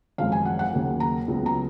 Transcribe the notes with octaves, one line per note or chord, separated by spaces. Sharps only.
G#1 F#2 F3 G#3 F5
G#5
F#5
F#5
D#2 C#3 F#3 A#3
A#5
C#2 C#3 F#3 B3
A#5